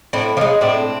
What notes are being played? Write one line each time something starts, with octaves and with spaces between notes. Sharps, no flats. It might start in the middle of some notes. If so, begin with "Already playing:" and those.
A2 C4 D4
F3 C#4 D#4
G#3
A2 C4 D4